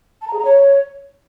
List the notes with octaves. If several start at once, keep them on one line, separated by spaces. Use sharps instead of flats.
A5
A#5
G#4
A#5
C#5